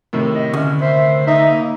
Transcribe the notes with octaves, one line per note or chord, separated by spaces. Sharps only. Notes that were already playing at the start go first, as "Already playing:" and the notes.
A2 C3 D#3
D#5
D2 C#4
C5 E5
D#4 E5
A#3